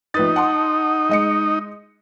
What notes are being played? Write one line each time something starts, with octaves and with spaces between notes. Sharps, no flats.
A#1 D#4 B4 A6
F#5 A5 C6
G#3 D#5 C#7